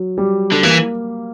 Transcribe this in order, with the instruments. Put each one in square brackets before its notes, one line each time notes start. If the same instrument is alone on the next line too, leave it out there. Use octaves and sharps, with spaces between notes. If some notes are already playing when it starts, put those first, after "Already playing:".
Already playing: [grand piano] F#3
G3
[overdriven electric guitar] D3
[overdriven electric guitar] E3 [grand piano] A#3